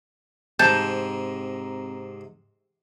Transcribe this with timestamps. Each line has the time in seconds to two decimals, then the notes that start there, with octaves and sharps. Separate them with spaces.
0.59 G#2 C3 C4 A5 A#5 G6